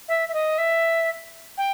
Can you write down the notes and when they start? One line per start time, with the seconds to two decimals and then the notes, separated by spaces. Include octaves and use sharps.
0.08 E5
0.29 E5
0.33 D#5
0.58 E5
1.57 G5